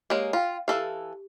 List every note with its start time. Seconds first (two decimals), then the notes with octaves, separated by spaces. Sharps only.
0.10 G#3 A#3 G4 C#5
0.33 F4 F5 G5
0.68 E3 G4 A4 F5